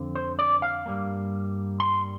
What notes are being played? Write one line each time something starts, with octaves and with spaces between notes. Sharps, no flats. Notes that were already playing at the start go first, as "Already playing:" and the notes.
Already playing: F2 D3 F3 C4
C5
D5
F5
G2 G3 A#3
C6